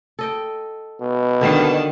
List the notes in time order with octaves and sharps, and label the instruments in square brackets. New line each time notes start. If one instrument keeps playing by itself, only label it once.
[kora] A4 D#5 G5
[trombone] B2
[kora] D3 G3 A#3 [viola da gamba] D#3 D4